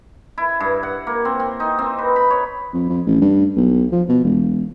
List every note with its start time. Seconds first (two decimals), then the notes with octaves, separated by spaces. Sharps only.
0.38 E4
0.60 G2
0.83 F#5
1.07 A#3
1.25 C4
1.40 C4
1.60 D#4
1.78 C4
1.98 B4
2.16 B5
2.30 C#5
2.73 F2
2.89 F2
3.06 A1
3.21 G2
3.57 B1
3.92 F3
4.09 B2
4.24 E1